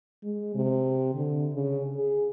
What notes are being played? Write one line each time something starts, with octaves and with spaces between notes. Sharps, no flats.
G#3
C3
D3
C#3
G#4